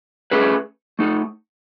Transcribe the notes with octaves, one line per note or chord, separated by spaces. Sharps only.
A3 C#4 G#4 B4
A3 D#4 A4